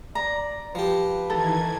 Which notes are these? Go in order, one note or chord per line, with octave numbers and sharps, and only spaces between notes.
D5 A#5
F3 G4 B4
D#3 E3 A4 A#5 G#6